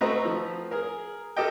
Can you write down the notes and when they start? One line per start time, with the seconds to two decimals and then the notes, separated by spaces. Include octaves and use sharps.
0.01 A3 C4 F#4 B4 D#5 A#5
0.25 F3
0.71 G#4 A#4
1.37 G4 A4 A#4 D#5 G5